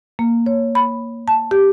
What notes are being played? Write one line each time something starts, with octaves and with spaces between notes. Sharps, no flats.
A#3
C#5
B5
A5
G4